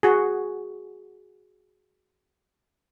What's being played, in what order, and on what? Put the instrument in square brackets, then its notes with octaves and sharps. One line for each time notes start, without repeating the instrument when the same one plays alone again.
[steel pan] F#4 G#4